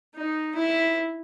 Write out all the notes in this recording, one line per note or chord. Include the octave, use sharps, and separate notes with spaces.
D#4
E4